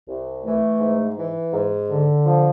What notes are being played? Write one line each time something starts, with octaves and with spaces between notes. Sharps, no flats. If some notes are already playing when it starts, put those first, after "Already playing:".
C2
E3 A3
G#2
E3
G#2
D3
F3